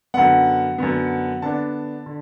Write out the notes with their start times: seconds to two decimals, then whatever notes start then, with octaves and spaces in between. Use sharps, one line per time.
0.14 F#2 D3 B3 F#5
0.78 F#2 D3 B3
1.42 D3 B3 D4 A5
2.06 D3